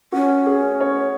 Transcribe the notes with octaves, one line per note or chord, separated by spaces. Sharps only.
C#4 F#4
G#4
C#5